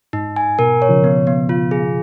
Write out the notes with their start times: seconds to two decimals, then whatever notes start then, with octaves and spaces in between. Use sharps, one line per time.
0.13 G#2 D#4
0.36 G#5
0.59 B2 A#4
0.82 C#5
0.89 C#3 F3
1.04 B3
1.27 B3
1.49 F4
1.71 G#4